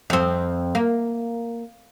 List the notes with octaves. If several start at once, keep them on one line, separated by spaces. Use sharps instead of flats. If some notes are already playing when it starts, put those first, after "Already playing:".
F2 C4
A#3